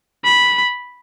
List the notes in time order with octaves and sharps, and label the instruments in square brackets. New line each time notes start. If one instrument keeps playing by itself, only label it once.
[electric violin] B5